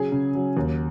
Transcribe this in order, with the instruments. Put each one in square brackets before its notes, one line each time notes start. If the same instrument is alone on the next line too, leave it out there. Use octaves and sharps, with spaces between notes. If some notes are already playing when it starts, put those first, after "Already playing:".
Already playing: [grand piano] C#3 F#3 G#4 G#5
C#3
F#3
D#2